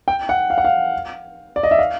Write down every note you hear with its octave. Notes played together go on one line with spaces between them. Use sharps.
G5
F#5
F5
F#5
F5
D5
D#5
E5
F5